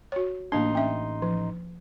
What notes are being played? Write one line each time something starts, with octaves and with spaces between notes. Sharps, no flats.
F#4 C#5
A1 A#3 D4 D#4 C6
C#4 E5
F3